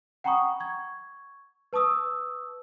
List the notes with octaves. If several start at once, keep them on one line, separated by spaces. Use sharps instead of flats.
F#5 G5 A#5 B5 C#6 D#6
C#6 G#6
B4 A5 C#6 D#6 E6